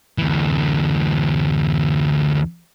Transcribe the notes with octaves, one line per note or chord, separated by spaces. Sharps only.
D2 E3